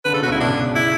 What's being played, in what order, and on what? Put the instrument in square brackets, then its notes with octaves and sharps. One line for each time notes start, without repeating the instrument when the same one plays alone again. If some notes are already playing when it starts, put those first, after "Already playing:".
[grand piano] D3 [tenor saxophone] B4
[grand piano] C#3 [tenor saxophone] A4
[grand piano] B2 [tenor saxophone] F#4
[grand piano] C#2 C#3 [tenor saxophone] E4
[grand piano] B1 B2 [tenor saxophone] D4
[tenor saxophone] E4